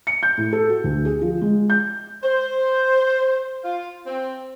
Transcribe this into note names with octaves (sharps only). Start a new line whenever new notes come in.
C#7
G6
A2
A4
F#4
D2
G#4
F3
G#3
G6
C5
F4
C4